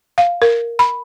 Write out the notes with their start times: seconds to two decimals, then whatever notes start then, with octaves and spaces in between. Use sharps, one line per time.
0.18 F5
0.42 A#4
0.79 B5